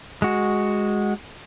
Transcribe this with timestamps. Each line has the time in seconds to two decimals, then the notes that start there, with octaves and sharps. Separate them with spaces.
0.22 G#3 F#4